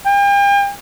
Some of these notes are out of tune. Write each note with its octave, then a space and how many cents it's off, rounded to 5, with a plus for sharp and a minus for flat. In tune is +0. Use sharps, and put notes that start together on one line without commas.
G5 +40